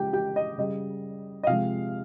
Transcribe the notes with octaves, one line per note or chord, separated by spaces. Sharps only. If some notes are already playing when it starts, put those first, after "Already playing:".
Already playing: C#3 F3 G#3 G4 G5
G4 G5
D#5
C#3 G3 D#5
D#5
C3 F3 G#3 F5